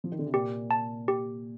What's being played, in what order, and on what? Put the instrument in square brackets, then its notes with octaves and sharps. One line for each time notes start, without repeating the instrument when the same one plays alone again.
[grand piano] F3
D#3
D3
C3
[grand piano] A#2 [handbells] G4
[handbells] A5
G4